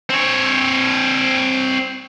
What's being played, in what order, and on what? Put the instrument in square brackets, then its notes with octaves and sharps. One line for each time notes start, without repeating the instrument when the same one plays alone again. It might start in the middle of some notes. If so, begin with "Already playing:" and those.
[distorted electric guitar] C4 C#5